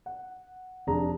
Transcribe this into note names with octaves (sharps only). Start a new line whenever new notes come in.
F#5
F1 D4 G#4 A#5